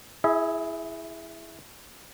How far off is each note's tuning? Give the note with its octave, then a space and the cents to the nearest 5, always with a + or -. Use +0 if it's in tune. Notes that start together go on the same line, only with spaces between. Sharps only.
E4 +0 G#4 +0 E5 -40